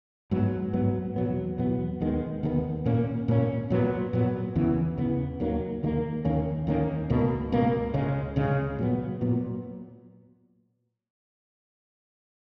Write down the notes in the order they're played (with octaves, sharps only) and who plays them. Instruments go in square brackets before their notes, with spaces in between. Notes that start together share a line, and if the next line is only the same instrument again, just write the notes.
[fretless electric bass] G#2 F#3 B3
G#2 F#3 B3
E2 B2 F#3 B3
E2 B2 F#3 B3
D#2 D#3 G#3 B3
D#2 D#3 G#3 B3
A#2 A#3 C#4
A#2 A#3 C#4
A#2 F#3 B3
A#2 F#3 B3
E2 C#3 E3 B3
E2 C#3 E3 B3
D#2 D#3 F#3 A#3
D#2 D#3 F#3 A#3
D#2 D#3 A#3 C#4
D#2 D#3 A#3 C#4
C#2 B2 A#3
C#2 B2 A#3
C#2 C#3 G#3 C#4
C#2 C#3 G#3 C#4
A#2 F#3 B3
A#2 F#3 B3